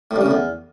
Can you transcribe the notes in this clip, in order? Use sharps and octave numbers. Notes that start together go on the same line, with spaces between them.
A2
G2
C#3
A2
E2